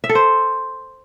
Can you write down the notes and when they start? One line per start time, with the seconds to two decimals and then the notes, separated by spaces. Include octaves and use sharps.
0.04 E5
0.09 A4
0.15 C5